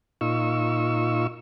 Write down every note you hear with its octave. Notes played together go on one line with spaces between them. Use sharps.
A#2 D#4 F4 C#6 E6